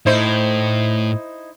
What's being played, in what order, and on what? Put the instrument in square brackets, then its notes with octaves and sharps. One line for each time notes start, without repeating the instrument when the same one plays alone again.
[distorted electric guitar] A2 [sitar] D#4 E4 C5